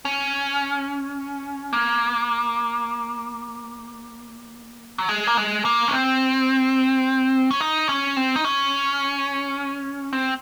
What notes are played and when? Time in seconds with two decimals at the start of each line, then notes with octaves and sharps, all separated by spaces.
0.05 C#4
1.73 A#3
4.98 F#3
5.09 G#3
5.27 A#3
5.37 G#3
5.65 A#3
5.88 C#4
5.93 C4
7.51 C#4
7.61 D#4
7.89 C#4
8.16 C4
8.36 D#4
8.45 C#4
10.13 C4